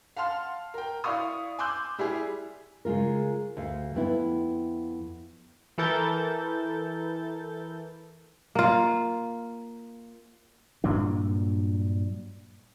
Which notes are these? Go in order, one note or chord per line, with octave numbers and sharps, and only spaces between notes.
F5 F#5 A5 C6 F6
A#4 G5
E4 D5 F5 C#6 D#6
G#5 C6 D6 E6 F#6 G6
G3 E4 G4 G#4
C#3 G#3 F4 A#4
D2 F5
F2 B3 E4
E3 E4 A4 A#4 G6 A6
A#3 F4
G2 A#2 F#3 D4